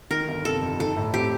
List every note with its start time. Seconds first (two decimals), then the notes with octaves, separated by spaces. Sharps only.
0.10 D#3 A#4
0.29 G1
0.45 C3 A4
0.62 F2
0.79 D#4 A4
0.96 A2
1.13 C4 G4